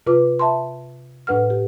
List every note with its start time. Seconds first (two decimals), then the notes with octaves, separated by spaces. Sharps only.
0.07 C3 F4 B4 D6
0.39 E5 A5 B5 C6
1.27 A2 D4 B4 F#5 F6
1.50 G4